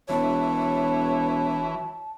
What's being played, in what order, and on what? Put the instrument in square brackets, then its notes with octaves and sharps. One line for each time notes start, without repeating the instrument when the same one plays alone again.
[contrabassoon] E1 [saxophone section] B2 F#3 C#5 [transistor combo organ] E3 [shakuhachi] A5